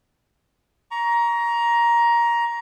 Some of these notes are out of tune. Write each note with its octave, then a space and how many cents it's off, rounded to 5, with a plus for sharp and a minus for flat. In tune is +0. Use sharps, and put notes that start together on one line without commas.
A#5 +15 C#6 +30